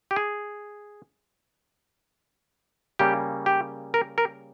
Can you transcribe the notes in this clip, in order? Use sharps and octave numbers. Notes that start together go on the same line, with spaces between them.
G4
G#4
C#3 G3 A#3 C#4 G4
G4
A#4
A#4